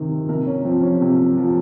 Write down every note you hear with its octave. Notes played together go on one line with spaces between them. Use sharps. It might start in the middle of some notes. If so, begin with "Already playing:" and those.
Already playing: C3 D#3
C3 A#4
C#4
F3 C4
C#4
C3
F3